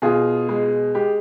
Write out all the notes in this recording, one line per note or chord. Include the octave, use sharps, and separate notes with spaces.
B2 F4 G#4
G#3
G#3 G4